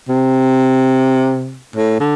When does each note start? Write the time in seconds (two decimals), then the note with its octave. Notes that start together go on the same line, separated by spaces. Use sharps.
0.08 C3
1.76 A2
2.00 D3